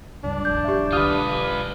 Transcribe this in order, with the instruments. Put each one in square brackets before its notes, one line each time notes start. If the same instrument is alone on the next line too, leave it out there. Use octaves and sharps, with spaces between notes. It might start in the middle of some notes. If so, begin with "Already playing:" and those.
[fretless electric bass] C#2 G2 [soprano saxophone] D4
[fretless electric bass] E1 B1 [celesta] G6
[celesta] G4 E5
[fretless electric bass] E1 B1 D3 [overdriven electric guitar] F4 B4 [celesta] D#6 F6 D#7